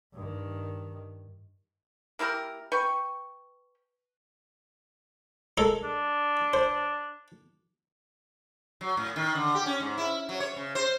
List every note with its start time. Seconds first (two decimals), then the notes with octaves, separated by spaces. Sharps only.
0.14 G2 D#3
2.19 A#3 E4 G4 A#4
2.72 B4 G5 C#6
5.58 G#3 A4 A#4
5.83 D4
6.54 C5
8.81 F#3
8.97 A2
9.16 D#3
9.35 D3
9.55 G4
9.66 C#4
9.80 G#2
9.98 E4
10.29 F#3
10.40 C#5
10.56 C#3
10.75 C5